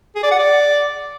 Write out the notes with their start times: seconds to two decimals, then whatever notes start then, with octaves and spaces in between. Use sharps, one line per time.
0.16 G#4
0.24 D5
0.31 F#5
0.39 D5